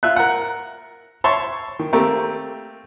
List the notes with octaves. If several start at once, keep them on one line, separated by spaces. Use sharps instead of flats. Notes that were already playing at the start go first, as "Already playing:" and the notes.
F4 E5 F#6
A#4 F#5
C#5 E5 A5 C6
D#3
A3 A#3 C4 G4 A#4